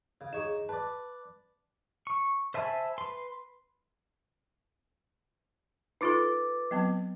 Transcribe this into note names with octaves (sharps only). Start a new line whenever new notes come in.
C#3
D#4 G#4 C#5 E7
B4 D5 A5
C#6
C5 E5 G#5 A5 B5
B4 C6
D#4 F4 A4 B4 D6 A6
F#3 B3 C4